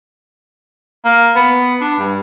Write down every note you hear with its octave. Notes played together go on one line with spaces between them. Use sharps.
A#3
B3
D4
G2